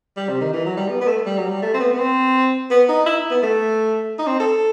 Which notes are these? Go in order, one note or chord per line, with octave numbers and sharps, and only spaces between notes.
G3
C3
D#3
E3
F#3
G3
B3
B3
A3
G3
F#3
G3
A3
C4
B3
B3
C4
B3
D#4
E4
B3
A3
D#4
C4
A4